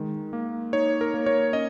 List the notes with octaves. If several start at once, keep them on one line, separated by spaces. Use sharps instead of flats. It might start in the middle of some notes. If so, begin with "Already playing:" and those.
Already playing: D#3 G#3
A#3
D#4 C#5
A#4
A#3
C#5
C#4 D#5